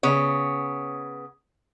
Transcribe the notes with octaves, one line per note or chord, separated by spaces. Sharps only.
C#3 B3 C#5